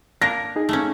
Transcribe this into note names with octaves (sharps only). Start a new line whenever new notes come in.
A#3 D4 A#4 A#6
D#4 G#4
A3 A#3 C#4